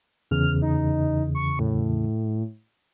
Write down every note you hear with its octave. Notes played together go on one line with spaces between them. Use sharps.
E2 C#3 E3 F6
D#4
C#6
A2